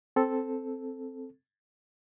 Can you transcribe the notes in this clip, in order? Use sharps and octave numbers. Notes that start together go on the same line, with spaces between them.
C4 A4